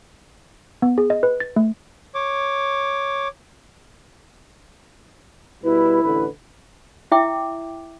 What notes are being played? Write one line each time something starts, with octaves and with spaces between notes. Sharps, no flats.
B3
G#4
D#5
B4
A6
A3
C#5 D6
B2 G3 E4 B4
A1 D3 B4
E4 E5 G5 D6